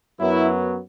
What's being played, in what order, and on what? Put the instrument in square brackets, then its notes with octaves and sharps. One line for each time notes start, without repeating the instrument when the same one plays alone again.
[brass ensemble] F#2 F#3 B3 E4